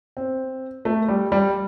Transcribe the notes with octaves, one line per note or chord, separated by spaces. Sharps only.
C4
A3
G3
G3